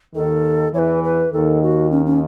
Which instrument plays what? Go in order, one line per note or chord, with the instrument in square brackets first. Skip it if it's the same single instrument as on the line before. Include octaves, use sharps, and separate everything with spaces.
[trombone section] D#2 D#3 [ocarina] A4
[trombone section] E2 E3 [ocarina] B4 C#5
[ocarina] B4
[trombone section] D#2 D#3 [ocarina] A4
[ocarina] F#4
C#4
C#4